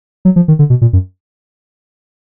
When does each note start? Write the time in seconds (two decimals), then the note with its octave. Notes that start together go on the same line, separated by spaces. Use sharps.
0.25 F#3
0.36 F3
0.48 D#3
0.59 D3
0.70 B2
0.81 A#2
0.93 F#2